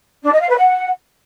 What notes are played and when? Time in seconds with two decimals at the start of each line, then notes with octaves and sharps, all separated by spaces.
0.24 D4
0.32 D#5
0.40 F5
0.48 B4
0.57 F#5